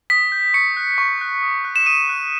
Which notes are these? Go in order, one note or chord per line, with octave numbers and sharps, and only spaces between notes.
D#6 B6
G6
C#6 C#7
F#6
C#6
F#6
D#6
F#6
E7
D#6 D#7
F#6